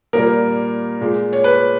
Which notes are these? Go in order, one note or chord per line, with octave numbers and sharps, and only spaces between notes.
A#2 G3 A#3 A#4
A#2 G#3
C#5
B4